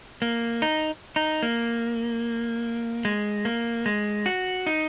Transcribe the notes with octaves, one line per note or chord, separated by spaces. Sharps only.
A#3
D#4
D#4
A#3
G#3
A#3
G#3
F#4
D#4